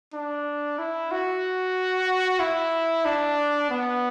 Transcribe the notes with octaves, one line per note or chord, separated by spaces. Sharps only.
D4
E4
F#4
E4
D4
B3